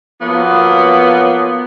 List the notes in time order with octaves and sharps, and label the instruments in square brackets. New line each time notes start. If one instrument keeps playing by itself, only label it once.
[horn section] F3 F#3 A#3 B3